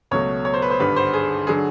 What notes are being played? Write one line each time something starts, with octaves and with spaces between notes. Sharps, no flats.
C#2 B2 F#3 A3 C#5
C#5
C5
B4
C5
G#1 G2 D3 B4
C5
G#4
D3 F#3 G#4